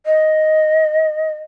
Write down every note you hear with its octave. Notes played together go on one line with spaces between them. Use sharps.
D#5